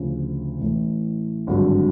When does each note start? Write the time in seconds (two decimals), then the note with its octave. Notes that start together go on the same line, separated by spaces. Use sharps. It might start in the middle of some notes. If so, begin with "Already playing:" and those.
Already playing: D2 C#3 F3
0.59 A1 A2 E3 A3
1.47 G#1 G2 D3 F#3